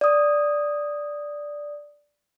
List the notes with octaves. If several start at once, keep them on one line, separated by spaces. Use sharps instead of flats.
D5 D#6